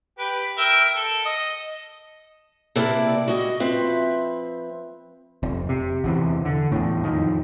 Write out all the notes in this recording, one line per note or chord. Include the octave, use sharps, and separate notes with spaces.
G4 B4
A#4 E5 G5
A4
D#5
C3 A#3 E4 B4 D5 A5
F#4 D#5
F3 C4 B4 E5
F1 F2
C3
E2 C3 E3
D3
E2 A2
F2 D#3